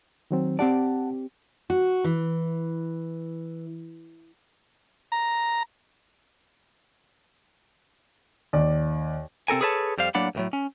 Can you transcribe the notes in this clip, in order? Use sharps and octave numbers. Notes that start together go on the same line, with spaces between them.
D#3 F#3 C4
C4 G4 D5 F#5 A5
F#4
E3
A#5
D#2 D5
C3 C4 A4 A#4 G#5
G#4 A4 B4 C#5 F5 A5
F2 G3 C5 F5
A2 F#3 A#3 D4 F#5 B5
C2 A2 F#3
C#4